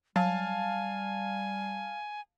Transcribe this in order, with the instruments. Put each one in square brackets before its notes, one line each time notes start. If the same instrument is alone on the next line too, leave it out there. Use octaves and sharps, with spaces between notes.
[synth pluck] F#3 [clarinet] G3 [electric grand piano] F5 A5 [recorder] G#5